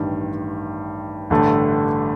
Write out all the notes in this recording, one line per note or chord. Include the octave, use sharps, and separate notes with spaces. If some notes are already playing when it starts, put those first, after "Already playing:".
Already playing: A1 G2 D#3
A1 G2 D3 A3